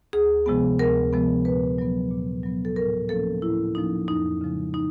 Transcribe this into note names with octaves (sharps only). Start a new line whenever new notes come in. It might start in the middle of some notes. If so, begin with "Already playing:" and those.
D2 G#4
C3 F3 G#3 B3
D2 A#4
C3 F3 G#3 B3
A#2 B4
F#3 B3
A#2
F#3 B3
A4
A2 A#4
F3 A#3 C#4 A4
A2 E4
F3 A#3 C#4 D#4
F2 D#4
C#3 F3 G#3
D#4